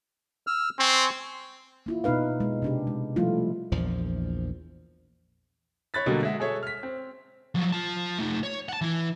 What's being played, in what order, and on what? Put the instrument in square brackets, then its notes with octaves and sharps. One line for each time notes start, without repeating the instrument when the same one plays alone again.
[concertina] E6 F6
[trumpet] C4 [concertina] G#5 C6 C#6
[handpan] A#3 E4 F4
B2 B3 D#4 B4 F5
G#3
C3 D4 G4
G#3
F3 G3 A3 E4 F4
[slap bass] A#1 E2 F3
[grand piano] C#5 B5 F#6 A6 B6
B2 D3 F#3 G3 A#3
G#3 E5 F#5
G#4 A4 C#5 E5
F6 B6
C4
[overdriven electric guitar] F3 F#3
F4 A5
A3 D#4
C#5
F#5 A5
E3 E4